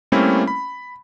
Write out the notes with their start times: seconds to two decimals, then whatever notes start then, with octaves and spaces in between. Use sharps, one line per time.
0.12 G3 A3 A#3 C4 C#4 E4
0.47 B5